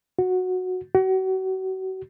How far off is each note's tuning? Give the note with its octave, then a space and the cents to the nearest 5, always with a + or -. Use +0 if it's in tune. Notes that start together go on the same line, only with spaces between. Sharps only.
F#4 -10
F#4 +35